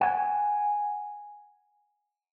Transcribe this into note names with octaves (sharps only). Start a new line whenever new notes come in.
F#5 G#5